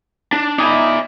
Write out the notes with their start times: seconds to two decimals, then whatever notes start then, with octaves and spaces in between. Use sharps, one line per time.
0.33 D4
0.58 D#4 E4 D5 G#5